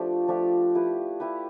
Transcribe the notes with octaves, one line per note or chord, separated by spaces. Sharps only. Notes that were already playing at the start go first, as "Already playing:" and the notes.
Already playing: F3 A3 D4 G4
F3 A3 D4 G4
E4 G4 B4
E4 G4 B4